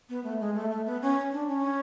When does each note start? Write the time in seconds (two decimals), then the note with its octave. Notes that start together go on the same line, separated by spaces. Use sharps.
0.09 B3
0.24 A3
0.40 G#3
0.55 A3
0.71 A3
0.86 B3
1.02 C#4
1.32 D4
1.48 C#4